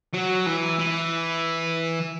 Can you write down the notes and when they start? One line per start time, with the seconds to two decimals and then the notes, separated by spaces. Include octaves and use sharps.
0.13 F#3
0.46 E3
0.79 E3